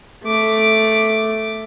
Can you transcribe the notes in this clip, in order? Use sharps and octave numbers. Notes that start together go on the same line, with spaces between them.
A3 D6